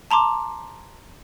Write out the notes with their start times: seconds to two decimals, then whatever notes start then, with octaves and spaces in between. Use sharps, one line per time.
0.11 A5 A#5 C6 D6